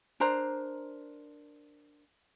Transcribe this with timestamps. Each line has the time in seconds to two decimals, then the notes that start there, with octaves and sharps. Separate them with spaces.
0.20 D4 A#4 C5 A#5